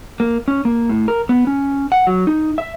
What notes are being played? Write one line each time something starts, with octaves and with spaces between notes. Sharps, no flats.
A#3
C#4
A#3
A2
A#4
B3
C#4
F#5
F#3
D#4
E5